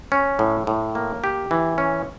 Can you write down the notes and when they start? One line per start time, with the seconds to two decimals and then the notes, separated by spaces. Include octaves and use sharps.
0.12 C#4
0.39 A2
0.67 A2
0.95 A#3
1.24 G4
1.51 E3
1.78 C#4